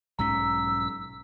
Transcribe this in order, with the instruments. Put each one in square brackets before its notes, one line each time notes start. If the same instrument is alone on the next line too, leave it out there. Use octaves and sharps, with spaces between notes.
[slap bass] B1 G#2 C#4 [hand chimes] A#5 B6 [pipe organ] E6